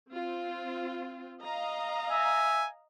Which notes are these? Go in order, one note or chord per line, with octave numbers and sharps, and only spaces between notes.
C4 F4
D#5 F5 A#5
E5 G#5